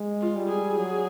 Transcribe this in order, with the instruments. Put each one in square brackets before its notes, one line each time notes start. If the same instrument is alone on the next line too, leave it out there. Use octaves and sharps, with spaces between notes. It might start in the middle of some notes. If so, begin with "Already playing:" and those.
Already playing: [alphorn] G#3
[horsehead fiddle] F4
[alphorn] G3
[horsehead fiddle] G#4
[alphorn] F#3